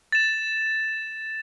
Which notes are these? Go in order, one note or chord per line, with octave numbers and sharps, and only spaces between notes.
A6 E7